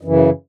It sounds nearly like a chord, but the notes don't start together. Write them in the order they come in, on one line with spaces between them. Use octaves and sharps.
F#2 E3 C#3